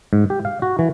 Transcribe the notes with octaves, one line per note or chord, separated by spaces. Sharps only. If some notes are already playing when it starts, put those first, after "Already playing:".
G#2
G4
F5
F#4
E3